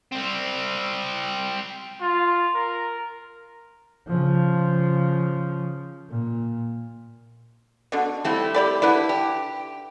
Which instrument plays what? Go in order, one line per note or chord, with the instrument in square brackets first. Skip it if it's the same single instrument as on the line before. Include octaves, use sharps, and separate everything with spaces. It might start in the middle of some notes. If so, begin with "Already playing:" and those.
[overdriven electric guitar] G3 C4
[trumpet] F4
A#4
[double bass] C#3 F3
A#2
[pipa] B2 D3
[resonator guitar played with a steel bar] G3 A3 E4 [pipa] C4
[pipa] G4 D5 B5
[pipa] D3 B4 D5 [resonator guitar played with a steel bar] E4
[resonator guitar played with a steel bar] G4